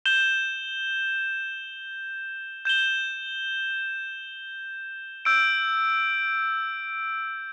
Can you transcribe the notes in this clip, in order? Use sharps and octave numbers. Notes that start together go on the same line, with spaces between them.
G6 E7 G7
G6 E7 G7
E6 G6 D7